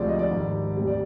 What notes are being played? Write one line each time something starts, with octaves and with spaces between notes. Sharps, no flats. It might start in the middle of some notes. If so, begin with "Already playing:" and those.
Already playing: D2 C3 F3 G#3 D5
D#5
D5
G#1 G#2 G3
D2 C3 G3
D5